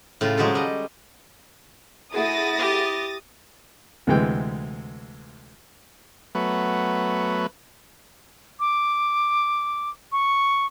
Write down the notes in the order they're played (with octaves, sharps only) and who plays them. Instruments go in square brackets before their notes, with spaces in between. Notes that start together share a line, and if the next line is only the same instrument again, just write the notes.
[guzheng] A2 C#3 F4
F3 F#3 G#3 F#4 G4 A4
G3 D#5
[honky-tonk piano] A3 F#4 G#4 [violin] E4 [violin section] D#6 A6 A#6
[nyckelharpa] G4
[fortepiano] D2 C3 E3 G#3 G5
[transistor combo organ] F#3 A3 B3 B4
[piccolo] D6
C#6